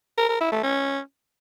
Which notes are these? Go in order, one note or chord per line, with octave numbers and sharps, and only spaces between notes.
A#4
A#4
E4
A3
C#4